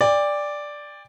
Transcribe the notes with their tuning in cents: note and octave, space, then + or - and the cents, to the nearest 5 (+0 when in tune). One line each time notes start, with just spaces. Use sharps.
D5 +0 G5 +40